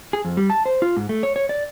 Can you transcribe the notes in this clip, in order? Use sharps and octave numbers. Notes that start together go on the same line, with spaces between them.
G#4
F2
G3
A5
C5
F4
G#2
A3
C#5
C#5
D5